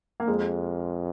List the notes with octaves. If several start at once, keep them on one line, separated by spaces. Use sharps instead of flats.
A#3
F2 G#3